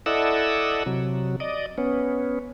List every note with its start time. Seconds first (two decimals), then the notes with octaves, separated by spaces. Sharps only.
0.06 E4 A4 D5 D#5 F#5 E6
0.86 C3 F#3
1.40 D5 D#5
1.78 B3 C#4